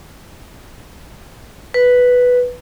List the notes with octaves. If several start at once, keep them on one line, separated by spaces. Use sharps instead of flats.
B4